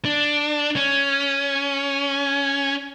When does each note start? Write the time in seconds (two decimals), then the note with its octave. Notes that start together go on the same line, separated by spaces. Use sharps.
0.05 D4
0.76 C#4